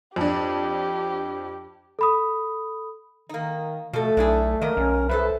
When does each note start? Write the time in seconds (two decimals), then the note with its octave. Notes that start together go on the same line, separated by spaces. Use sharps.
0.16 F2 D4 G4
1.99 A4 B5 D#6
3.29 D#3 A#3 D#4
3.93 B2 F3 A3 A4
4.17 B1 D4 E4 G#4 A4
4.61 D#3 A#3 A#4 D#5
4.77 B1 C#4
5.09 C2 A4 B4 C5 E5